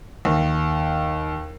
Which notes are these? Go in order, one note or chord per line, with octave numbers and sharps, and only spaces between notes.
D#2